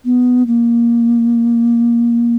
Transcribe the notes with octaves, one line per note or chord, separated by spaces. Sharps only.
B3
A#3